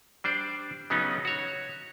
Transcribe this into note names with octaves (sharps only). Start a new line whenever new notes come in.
G3 D4 C5 D5
C#3 F#3 B3 C#4 D#4
F#4 C#5